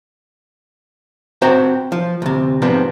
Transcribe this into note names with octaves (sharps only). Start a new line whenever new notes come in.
C4 F#4 C5 G5 A#5
F3
D2 C3
G#2 C3 F3 B3 D4